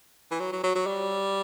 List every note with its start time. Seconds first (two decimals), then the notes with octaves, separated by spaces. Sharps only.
0.31 E3
0.40 F#3
0.52 F#3
0.64 F#3
0.75 F#3
0.86 G3